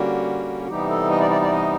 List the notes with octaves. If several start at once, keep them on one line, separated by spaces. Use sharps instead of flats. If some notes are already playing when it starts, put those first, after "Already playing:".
Already playing: D3 G3 A#3 C#4 F#4
F#4
C3 E3 G3 B3 D#4 G4
A4
D#5
D5
D5
D5
D#5